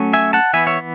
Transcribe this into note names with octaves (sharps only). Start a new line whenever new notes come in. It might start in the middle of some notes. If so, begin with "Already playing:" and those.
Already playing: F#3 A3 C#4
E5 G#5
F#5 A5
E3 B3 E5 G#5
C#5 E5